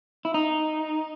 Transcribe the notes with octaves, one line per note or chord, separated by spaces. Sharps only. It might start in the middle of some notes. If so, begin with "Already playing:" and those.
E4
D#4